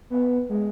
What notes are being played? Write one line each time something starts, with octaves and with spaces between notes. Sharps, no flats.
B3
G#3